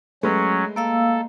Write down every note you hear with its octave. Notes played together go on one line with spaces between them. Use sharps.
F#3 G#3 A3 C#4 B4
A#3 A4 F5 E6